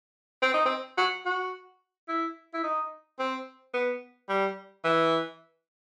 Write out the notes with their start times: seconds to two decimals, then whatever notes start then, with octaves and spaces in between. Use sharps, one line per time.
0.42 C4
0.54 D#4
0.65 C4
0.98 F#4
1.25 F#4
2.08 E4
2.54 E4
2.63 D#4
3.19 C4
3.74 B3
4.29 G3
4.84 E3